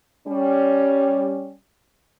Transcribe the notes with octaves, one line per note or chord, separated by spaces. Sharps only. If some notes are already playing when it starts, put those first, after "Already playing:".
G3 C#4